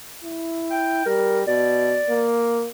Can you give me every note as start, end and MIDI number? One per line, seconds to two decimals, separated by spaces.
0.23 1.01 64
0.71 1.04 79
1.06 1.45 55
1.06 1.40 70
1.47 1.99 47
1.47 2.28 74
2.09 2.68 58